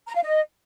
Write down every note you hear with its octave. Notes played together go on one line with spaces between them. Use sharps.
A#5
F5
D#5